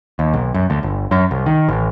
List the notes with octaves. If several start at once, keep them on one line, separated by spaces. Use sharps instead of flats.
D#2
B1
F#2
D2
G1
F#2
C2
D#3
A1